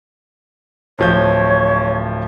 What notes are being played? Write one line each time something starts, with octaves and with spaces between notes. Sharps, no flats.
D1 F3 C#5 G6